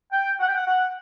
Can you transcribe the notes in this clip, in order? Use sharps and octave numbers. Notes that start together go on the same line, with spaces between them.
G5
F#5
G5
F#5
F#5